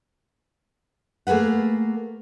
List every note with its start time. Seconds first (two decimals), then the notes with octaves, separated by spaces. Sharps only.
1.27 A3 A#3 G#4 B4 F#5